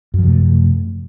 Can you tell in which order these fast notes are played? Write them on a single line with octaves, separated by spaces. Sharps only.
F#2 F3 C3 A3